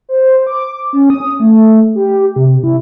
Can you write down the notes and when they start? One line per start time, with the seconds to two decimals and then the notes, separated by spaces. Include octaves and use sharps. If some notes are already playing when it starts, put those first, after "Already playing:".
0.09 C5
0.47 D6
0.93 C#4
1.10 D#6
1.40 A3
1.95 G4
2.36 C3
2.64 E4